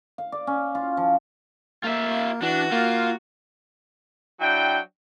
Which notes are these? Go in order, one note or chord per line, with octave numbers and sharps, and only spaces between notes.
F5
D5
C#4
F4
F3
A#3 F4 E5
E3 D4 F#4
A#3 F4
F#3 D4 E4 G5